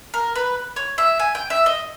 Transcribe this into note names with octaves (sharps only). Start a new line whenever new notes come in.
A#4
B4
C#5
E5
G#5
G5
E5
D#5